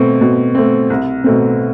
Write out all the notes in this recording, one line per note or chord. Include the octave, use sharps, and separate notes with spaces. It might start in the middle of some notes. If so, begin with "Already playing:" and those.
Already playing: B2 A3 C4
B2
A3 C4
C2
B2 A3 C4